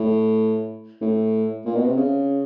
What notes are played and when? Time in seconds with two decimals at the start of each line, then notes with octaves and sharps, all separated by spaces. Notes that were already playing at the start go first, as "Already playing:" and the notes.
Already playing: A2
1.02 A2
1.65 A#2
1.76 B2
1.86 C3
1.97 C#3